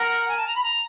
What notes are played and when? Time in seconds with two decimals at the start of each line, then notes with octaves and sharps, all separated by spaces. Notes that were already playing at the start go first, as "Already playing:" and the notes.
Already playing: A#4 F#5
0.28 G#5
0.36 A5
0.46 A#5
0.54 B5
0.63 A#5